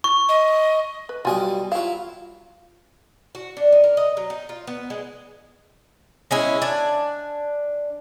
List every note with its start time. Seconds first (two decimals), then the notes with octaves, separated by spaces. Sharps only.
0.04 C#6
0.29 D#5
1.09 B4
1.25 B1 G3 F4 D#5 G#5
1.72 F#3 E4 F4 F5
3.35 F#4
3.57 D4
3.72 D#4
3.84 A#4
3.97 D#5
4.17 F#3
4.30 D#4
4.49 F4
4.67 B3
4.90 G#3
6.31 G#3 C#4 E4
6.62 D4 G#5